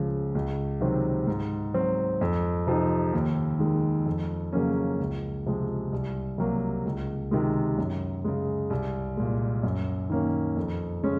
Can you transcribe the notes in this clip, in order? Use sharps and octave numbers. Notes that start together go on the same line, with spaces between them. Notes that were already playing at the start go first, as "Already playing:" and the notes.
Already playing: C#2 C#3 F3
C#2
C3 D#3 F#3 C4
G#2
F#3 C4
F2
C3 F3 C4 D#4
D#2
D#3 G#3
F2
C#3 F#3 A#3 C#4
C#2
C3 F3 G#3
C2
C3 F#3 A#3
C#2
C3 D#3 G#3
F#2
C#3 G#3
C2
A#2 G#3
F#2
D#3 A#3 C#4
F2
C#3 G#3 C#4